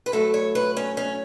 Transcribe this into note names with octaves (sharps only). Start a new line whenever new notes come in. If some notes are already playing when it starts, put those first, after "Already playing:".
B4
A2 F#3 A3 A4
C#5
B4
C#4
C#4